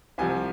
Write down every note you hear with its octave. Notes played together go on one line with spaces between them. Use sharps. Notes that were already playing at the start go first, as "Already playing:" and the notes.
C2 C3 F3 G#5